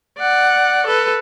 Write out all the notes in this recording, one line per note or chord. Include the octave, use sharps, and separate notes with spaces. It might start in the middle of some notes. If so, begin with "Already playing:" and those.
D5 F#5
A4 B4